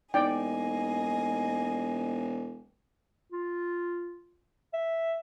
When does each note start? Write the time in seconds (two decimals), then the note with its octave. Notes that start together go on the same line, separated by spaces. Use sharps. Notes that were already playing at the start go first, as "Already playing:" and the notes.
0.14 E1 A#3 D#4 D5 D#5 G5 G#5
3.32 F4
4.73 E5